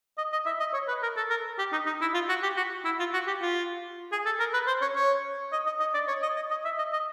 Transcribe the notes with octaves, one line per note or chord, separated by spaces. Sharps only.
D#5
D#5
E5
D#5
C#5
B4
A#4
A4
A#4
G4
D#4
D#4
E4
F4
F#4
G4
F#4
E4
F4
F#4
G4
F4
G#4
A4
A#4
B4
C5
C#5
C#5
D#5
D#5
D#5
D5
C#5
D#5
D#5
D#5
E5
D#5
D#5